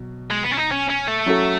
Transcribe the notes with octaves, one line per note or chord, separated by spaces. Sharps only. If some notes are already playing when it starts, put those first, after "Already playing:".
Already playing: B2 F#3
G#3
B3
C#4
D#4
C#4
C#4
A3
F#3 C#4 F#4 A4